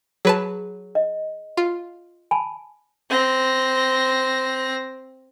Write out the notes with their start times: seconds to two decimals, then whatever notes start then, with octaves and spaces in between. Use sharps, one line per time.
0.25 F#3 G#4 B4 A5
0.95 D#5
1.57 F4
2.31 G#5 A5 B5
3.10 C4 A#6